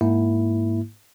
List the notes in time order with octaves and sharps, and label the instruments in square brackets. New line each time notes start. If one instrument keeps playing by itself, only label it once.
[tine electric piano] G#2 A#3 E4